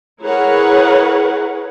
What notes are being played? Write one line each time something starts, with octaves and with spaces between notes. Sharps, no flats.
E4 G#4 A#4 B4 C#5 F#5